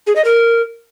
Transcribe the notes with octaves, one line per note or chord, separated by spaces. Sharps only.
G#4
D#5
A#4